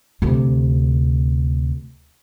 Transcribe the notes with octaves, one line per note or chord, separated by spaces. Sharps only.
D2 C3